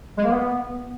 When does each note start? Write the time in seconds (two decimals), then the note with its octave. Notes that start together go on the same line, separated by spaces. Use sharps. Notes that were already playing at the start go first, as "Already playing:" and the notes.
0.17 G#3
0.23 A#3
0.30 B3